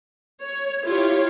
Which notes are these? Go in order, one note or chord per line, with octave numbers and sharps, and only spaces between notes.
C#5
E4 F4 G4 C#5